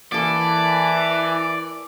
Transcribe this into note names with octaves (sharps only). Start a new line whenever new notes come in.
E3 A#3 A4 D5